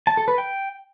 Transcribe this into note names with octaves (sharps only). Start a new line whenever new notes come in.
A5
A4
B4
G5